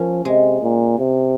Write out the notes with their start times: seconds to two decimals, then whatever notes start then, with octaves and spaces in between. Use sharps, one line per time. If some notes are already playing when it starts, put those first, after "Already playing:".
Already playing: F3 A#3 C#4
0.25 C3 G#3
0.62 A#2
0.99 C3